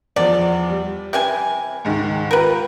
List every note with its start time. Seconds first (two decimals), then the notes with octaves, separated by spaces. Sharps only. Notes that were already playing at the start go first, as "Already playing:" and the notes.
0.16 E2 F3 D5
0.69 G3
1.13 C3 E3 G#5
1.85 C#2 G#2 D#3
2.31 F4 G4 A#4 B4